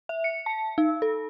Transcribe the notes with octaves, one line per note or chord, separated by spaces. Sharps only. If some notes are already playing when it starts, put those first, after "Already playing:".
E5
C#7
A5
D#4
A4